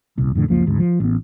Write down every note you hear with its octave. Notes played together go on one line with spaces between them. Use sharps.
D#1 C2
F2 A2 D3
C#2 F#2 F3 A#3
G#1 D2 G#2
F3
A1 B3